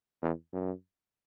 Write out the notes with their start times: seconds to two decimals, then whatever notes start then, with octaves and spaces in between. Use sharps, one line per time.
0.22 E2
0.53 F#2